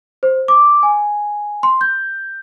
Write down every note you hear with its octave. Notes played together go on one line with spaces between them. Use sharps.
C5
D6
G#5
C6
G6